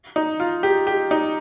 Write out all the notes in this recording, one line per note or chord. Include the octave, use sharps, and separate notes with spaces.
D#4
F4
G4
G4
D#4